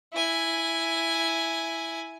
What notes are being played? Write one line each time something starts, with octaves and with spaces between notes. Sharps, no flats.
E4 G#5